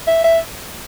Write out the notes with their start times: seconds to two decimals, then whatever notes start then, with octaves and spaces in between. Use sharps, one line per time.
0.07 E5
0.24 E5